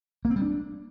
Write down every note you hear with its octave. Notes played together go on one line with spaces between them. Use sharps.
A#3
C4
G3
D4